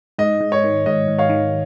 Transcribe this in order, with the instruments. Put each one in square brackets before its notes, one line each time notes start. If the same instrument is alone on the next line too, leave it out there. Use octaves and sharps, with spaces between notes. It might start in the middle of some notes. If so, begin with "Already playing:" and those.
[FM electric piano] G#2 [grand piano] D#5
[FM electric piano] G#2
[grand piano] C#5
[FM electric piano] D#3
[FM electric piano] G#2 [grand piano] D#5
[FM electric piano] G#2
[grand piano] C#5 F5
[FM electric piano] D#3